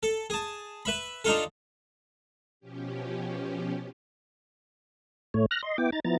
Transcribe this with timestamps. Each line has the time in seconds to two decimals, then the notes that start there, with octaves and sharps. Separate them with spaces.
0.03 A4
0.30 G#4 A5
0.85 B4 E5 B5
1.24 D4 D#4 F4 A4
2.60 B2 F3 C#4 G4
5.34 A2 A3 C#5
5.51 F6 F#6 A#6
5.63 D#5 C6
5.78 B3 E4 G5 D6
5.92 D#4 A#5 A6
6.04 F3 B3 E4 A#5 A6